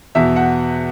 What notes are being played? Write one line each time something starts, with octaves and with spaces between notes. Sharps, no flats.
E2 B2 E5
F#5